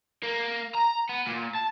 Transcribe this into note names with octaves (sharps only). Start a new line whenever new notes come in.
A#3
A#5
B3
A#2
A5